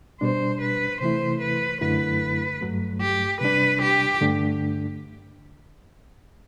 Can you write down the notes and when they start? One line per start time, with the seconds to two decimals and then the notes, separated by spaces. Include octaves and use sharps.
0.21 B2 G3 D4 C5
0.61 B4
1.01 C3 E3 A3 E4 C5
1.41 B4
1.81 F#2 D3 F#3 A3 E4 B4
2.61 G2 F#3 A3
3.01 G4
3.41 C3 G3 D4 B4
3.81 G4
4.21 G2 D3 A3 D4